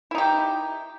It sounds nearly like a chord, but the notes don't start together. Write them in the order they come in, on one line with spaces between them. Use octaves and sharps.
E4 D#4 G4